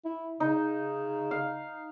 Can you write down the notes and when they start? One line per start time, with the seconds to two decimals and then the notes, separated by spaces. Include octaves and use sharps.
0.05 E4
0.40 C#3 D#4
1.31 F5